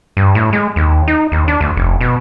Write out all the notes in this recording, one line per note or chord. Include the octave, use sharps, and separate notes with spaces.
G2
A2
G#3
D#2
D#4
D#2
D4
D2
F1
B2